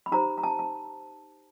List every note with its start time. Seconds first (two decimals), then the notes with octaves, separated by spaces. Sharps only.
0.06 B5
0.12 D#4 G4 C5 A#5
0.38 A#5
0.43 A5
0.59 A5